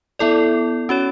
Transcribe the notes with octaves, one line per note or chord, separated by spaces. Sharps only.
B3 E4 A4 D5
C#4 F#4 C#5